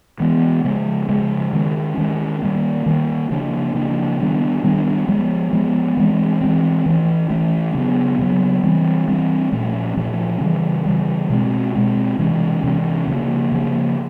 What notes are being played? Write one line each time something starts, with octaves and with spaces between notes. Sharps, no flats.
E3 G#3 B3
C#3 F3 G#3
C#3 F3 G#3
D#3 G#3 C#4
D#3 G#3 C#4
D#3 G3 A#3
D#3 G3 A#3
C#3 F3 A#3 D4
C#3 F3 A#3 D4
D#3 G3 B3 D4
D#3 G3 B3 D4
F3 G#3 B3
F3 G#3 B3
E3 G#3 C4
E3 G#3 C4
E3 A3 C#4
E3 A3 C#4
C#3 F#3 B3
C#3 F#3 B3
E3 G3 C4
E3 G3 C4
A#2 F3 A3 C#4
A#2 F3 A3 C#4
C#3 E3 G3
C#3 E3 G3
B2 G#3 C4
B2 G#3 C4
C3 E3 G#3 C#4
C3 E3 G#3 C#4
C#3 F3 A#3
C#3 F3 A#3